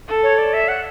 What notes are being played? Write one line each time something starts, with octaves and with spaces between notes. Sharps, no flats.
A4
C#5
D5
E5
F#5